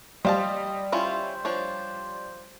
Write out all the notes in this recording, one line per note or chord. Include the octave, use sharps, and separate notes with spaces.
G3 C5 D#5 F5 A5
C#4 E4 F4 C5
F3 D4 C#5